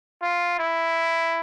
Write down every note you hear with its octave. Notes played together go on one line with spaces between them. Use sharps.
F4
E4